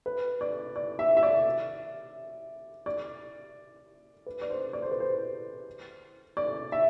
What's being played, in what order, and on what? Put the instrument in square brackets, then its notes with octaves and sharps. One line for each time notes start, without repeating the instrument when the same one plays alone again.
[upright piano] B4
D5
D5
E5
E5
D5
D5
B4
D5
C5
D5
C5
B4
C5
D5
E5